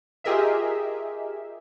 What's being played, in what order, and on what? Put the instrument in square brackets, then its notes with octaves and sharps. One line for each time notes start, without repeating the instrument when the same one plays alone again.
[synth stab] F4 G4 G#4 A#4 D#5 E5